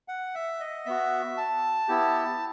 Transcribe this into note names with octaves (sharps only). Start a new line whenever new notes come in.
F#5
E5
D#5
B3 F#4 E5
A5
B3 E4 G4